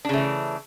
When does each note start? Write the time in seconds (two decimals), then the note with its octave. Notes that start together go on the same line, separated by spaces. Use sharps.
0.05 D4
0.09 C#3
0.13 A3
0.18 E3